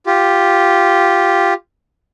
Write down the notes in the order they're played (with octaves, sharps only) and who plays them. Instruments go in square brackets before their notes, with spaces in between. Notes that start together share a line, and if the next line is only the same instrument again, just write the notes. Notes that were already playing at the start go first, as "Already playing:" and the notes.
[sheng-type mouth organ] F4 G4